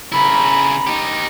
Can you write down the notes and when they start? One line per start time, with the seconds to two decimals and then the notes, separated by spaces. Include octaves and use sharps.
0.12 C#3 E4 A#5 B5
0.87 D#4 G4